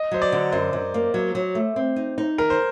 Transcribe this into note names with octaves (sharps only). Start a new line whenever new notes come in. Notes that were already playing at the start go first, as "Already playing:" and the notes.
Already playing: D#5
F#3 C5
D5
D3
F#2 C5
F#2
A#3
F#3
F#3
A3
C4
D#4
D#4
D#3 A#4
C5